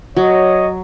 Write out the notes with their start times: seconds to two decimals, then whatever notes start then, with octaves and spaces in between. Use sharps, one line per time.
0.17 F#3 C#5 D#5